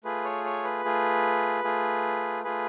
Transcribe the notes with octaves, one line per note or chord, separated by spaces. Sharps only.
A3 F4 G#4 B4
C#5
C#5
B4
A3 F4 G#4
A3 F4 G#4
A3 F4 G#4 B4